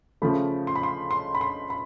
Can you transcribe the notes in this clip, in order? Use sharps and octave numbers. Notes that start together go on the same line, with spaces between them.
C#3 F3 A3 B5
C6
B5
C6
C6
B5
C6
B5